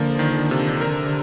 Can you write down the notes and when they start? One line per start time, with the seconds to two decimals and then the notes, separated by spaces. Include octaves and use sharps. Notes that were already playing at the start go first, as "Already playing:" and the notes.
Already playing: D3 F3 A#3
0.19 D#3
0.51 C3
0.81 A#4